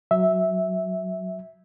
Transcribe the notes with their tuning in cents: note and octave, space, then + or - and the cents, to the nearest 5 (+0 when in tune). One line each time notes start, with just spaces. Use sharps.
F#3 +5 E5 -10